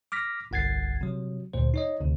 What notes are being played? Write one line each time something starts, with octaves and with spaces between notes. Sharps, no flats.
D6 F6 A#6 B6
G1 C2 F#5 G#6 A6 C7
C3 F#3
D2 A#2 C5
D#4 C#5 D#5
D2 C3